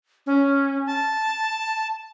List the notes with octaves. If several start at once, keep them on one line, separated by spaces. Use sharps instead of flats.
C#4
A5